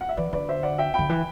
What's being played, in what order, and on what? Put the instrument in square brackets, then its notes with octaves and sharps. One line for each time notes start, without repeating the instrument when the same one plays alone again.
[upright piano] F#5
E5
[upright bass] E3 [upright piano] B4 D5
[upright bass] D3 [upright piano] B4 D5
[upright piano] C5 E5
D5 F#5
E5 G5
[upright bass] D3 [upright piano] G5 B5
[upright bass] E3